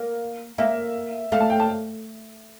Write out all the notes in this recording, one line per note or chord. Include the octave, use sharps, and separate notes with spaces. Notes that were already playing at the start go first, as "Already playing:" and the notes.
Already playing: A#3
A#3 E5
A3 F5
A5
G5
A5